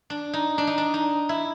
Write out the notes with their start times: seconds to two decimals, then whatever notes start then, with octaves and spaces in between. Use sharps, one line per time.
0.10 D4
0.33 D#4
0.58 D4
0.67 D#4
0.78 D4
0.94 D#4
1.29 E4